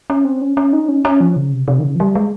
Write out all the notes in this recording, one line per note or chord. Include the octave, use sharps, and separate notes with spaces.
C#4
C4
C#4
C#4
D#4
C#4
C#4
F3
C#3
C3
C3
D#3
C#3
F3
G3
G#3